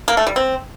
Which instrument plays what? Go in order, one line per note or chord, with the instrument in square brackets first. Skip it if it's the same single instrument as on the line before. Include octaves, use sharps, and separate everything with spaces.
[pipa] A#3
A3
G3
C4